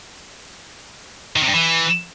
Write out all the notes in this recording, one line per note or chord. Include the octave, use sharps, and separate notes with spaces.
D#3
C3
G2
E3